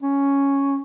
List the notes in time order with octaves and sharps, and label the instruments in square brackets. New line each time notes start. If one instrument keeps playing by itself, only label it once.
[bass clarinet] C#4